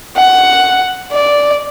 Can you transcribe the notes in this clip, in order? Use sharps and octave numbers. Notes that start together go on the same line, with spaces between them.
F#5
D5